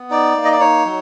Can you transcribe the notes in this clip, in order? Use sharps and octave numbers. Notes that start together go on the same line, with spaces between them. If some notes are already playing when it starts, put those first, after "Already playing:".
Already playing: B3
D#4 D5
A#3
D#5
D5
D#4 C#5
F#3